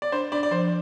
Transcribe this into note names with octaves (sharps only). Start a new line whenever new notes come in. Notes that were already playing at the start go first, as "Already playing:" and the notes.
D5
D4 C5
D4 D5
D5
F3 C5